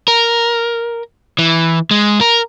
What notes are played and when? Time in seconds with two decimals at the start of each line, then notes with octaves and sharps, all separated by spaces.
0.08 A#4
1.39 E3
1.91 G#3
2.21 A#4